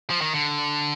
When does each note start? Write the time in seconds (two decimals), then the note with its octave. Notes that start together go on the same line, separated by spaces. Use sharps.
0.10 F3
0.21 D#3
0.33 D3